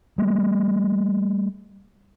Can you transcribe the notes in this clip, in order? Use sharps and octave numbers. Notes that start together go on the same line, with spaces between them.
G3 A3 A#3